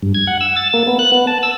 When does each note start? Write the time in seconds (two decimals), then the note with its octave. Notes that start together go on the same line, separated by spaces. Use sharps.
0.03 G2
0.14 G#6
0.27 F#5
0.41 E6
0.56 A6
0.74 A#3
0.87 B3
0.99 F#6
1.12 B3
1.27 A5
1.43 E6